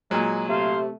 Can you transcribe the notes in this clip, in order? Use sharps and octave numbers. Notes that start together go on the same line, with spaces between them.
A#2 F#3 G#3
C3 A3 C5 F5